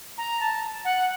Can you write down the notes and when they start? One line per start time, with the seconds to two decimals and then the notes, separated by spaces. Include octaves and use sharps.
0.18 A#5
0.40 A5
0.85 F#5